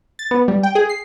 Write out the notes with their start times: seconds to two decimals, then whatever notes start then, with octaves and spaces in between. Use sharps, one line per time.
0.19 A6
0.31 B3
0.48 G3
0.63 G5
0.75 G#4
0.89 C7